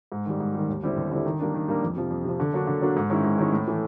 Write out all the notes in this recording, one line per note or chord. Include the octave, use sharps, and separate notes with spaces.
G#2
D#3 G3
G#2
D#3 G3
D#2
D3 G3 C4 E4
D#2
D3 G3 C4 E4
D#3
G3 A#3 D4
D#3
G3 A#3 D4
F2
C3 F3
F2
C3 F3
D3
F#3 A#3 D4 F#4
D3
F#3 A#3 D4 F#4
G#2
D#3 G#3 C#4 E4
G#2
D#3 G#3 C#4 E4
A2
E3 A3